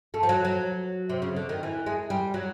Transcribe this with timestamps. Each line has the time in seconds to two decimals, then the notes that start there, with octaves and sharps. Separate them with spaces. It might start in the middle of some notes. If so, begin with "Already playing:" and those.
0.14 A3
0.23 F3
0.29 F#3
0.45 F#3
1.09 C3
1.22 C#3
1.36 D3
1.49 D#3
1.63 E3
1.86 G#3
2.10 G3
2.34 F#3